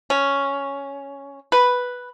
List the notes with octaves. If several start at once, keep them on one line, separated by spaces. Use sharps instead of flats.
C#4
B4